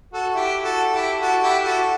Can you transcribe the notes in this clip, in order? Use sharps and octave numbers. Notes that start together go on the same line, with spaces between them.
F#4 A4
E4 G4
F#4 A4
E4 G4
F#4 A4
E4 G4
F#4 A4